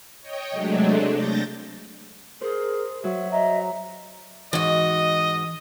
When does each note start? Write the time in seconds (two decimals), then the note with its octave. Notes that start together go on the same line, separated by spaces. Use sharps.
0.21 C#5 D#5 G5
0.51 C3 F#3 G#3 A3 D4
1.12 G6 A6 A#6
2.41 G#4 A#4 C5
3.04 F#3 E5
3.32 D#5 E5 A#5
4.53 G#2 E3 F#4 D#5